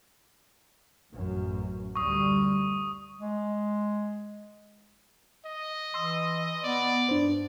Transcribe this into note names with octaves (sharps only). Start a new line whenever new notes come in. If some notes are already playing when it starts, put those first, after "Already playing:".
A1 F#2
D2 G3 C#6 D#6
G#3
D#5
E3 C6 D#6 E6
B3 D5
G2 D4 C5